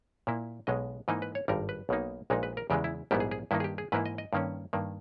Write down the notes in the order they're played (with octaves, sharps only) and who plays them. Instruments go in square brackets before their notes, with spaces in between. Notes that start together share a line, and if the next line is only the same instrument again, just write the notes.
[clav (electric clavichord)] A#2 A#3 E4
B1 B2 G#3 D#5
G#2 E3 A#3 D#4 D#5
B4
C#5
G#1 G2 G3 A#4
B4
B1 B2 A#3 D#4
A#1 A#2 G#3 D#4
B4
A#4
E2 C#3 E3 G#3 G4
E4
A#1 G#2 G3 B3 E4 G4
G#4
G#4
G2 D#3 A#3 D#4 E4
G#4
G4
G#4
G#2 E3 A#3 E4 B4
D#5
D#5
G2 D#3 A#3 C#4
G2 D#3 A#3